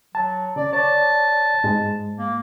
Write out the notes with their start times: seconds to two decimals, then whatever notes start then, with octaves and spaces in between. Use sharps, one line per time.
0.15 F#3 A5
0.56 C#3 D5
0.73 C#5 D5 A5
1.64 G#2 G#3
2.18 A#3